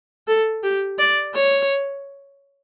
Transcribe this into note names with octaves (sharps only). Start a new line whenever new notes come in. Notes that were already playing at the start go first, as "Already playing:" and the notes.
A4
G4
D5
C#5